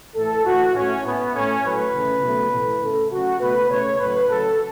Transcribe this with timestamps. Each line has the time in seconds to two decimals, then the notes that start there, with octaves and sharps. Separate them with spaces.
0.16 A2 E3 A3 A4
0.46 A2 E3 A3 F#4
0.75 A2 A3 C#4
1.04 A2 A3 B3
1.34 A2 A3 C#4
1.63 A2 F#3 A3 B4
1.93 C#3 E3 A3
2.22 B2 F#3 A3
2.52 A2 E3 A3
2.81 C#3 A3 A4
3.11 C#3 F#3 A3 F#4
3.40 B2 A3 B4
3.70 C#3 A3 C#5
3.99 A2 F#3 A3 B4
4.28 C#3 F#3 A3 A4